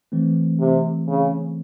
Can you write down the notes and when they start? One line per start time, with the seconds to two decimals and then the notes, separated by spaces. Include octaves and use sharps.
0.12 E3 A3 C4
0.60 C3
1.08 C#3